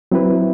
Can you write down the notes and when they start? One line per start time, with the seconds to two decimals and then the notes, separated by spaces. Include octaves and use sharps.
0.11 F#3 C4 E4 B4